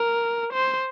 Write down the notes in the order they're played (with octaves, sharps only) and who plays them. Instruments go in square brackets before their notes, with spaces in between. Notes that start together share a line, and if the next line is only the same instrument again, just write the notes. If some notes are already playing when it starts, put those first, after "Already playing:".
Already playing: [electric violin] A#4
C5